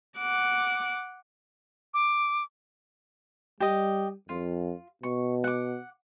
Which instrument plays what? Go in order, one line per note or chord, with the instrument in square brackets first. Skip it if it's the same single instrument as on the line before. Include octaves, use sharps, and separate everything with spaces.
[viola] F#5 D6
[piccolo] D6
[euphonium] G3 [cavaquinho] G4 D#5
[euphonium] F2 [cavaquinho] F4
[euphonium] B2 [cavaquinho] C#6
[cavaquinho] F#5 D6